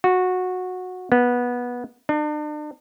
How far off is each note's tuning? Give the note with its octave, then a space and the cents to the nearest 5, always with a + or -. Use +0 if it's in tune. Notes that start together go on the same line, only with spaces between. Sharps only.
F#4 -15
B3 -15
D4 +40